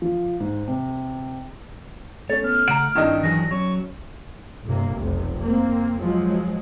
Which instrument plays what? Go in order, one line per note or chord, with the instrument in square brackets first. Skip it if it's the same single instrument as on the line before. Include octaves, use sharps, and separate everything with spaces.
[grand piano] F3
G#2
C3
[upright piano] A3 C#4 [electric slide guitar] C#5 [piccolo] A6
[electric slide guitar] B3 [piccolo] F6
[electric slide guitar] C#3 A3 F#5 [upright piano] A#5 D7
[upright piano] G2 D#3 D#5 [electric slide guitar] C4 E4
[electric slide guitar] E3 F#3 G#4 [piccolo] A#6
[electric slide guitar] F#3 [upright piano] C#4 [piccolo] C#6
[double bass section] G1 C3 A#3
F1 B1 C3
A#3 C4
F3 F#3 G#3